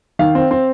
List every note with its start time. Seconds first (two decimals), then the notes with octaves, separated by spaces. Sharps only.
0.19 D#3 F5
0.35 C4
0.51 C4